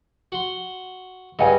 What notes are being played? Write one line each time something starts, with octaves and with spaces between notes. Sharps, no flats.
F#4 C6
G2 C#3 D#5 F#5 G#5